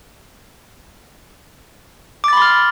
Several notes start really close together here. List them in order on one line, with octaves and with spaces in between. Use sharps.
D6 A6 B5 C6 F6